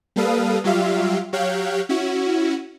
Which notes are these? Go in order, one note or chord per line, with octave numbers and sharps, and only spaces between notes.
G3 A#3 A4 B4 F5 D#6
F#3 G3 F4 G4 E5 F5
F#3 G4 C#5 F5 F#6 G6
C#4 E4 F#4